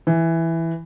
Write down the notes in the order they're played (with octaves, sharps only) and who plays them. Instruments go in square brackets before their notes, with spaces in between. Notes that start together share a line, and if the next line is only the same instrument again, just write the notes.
[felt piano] E3